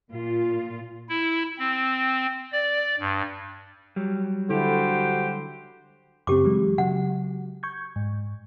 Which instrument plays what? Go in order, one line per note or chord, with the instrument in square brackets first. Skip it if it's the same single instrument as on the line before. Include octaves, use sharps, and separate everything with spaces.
[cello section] A#2 F4
[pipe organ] E4
C4
D5
G2
[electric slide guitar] F#3 G3
[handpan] D3 E4 A4 [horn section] F#4 G4 C5
[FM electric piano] F#2 C#3 C4 [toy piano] G4 D6
[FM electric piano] E3 F#3 G#3
[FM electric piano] C#3 F#3 [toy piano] F#5
[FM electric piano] C#6 G6 G#6
G#2